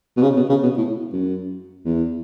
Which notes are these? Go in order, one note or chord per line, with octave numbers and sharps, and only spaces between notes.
B2
C#3
B2
C#3
B2
A2
F#2
E2